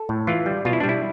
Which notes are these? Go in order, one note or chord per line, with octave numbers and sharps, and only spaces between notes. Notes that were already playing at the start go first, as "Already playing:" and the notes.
Already playing: A4
A2
E3 F4
G3
B2 F4
E4
D4
G3
E4